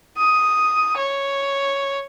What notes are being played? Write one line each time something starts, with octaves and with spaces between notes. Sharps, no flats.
D#6
C#5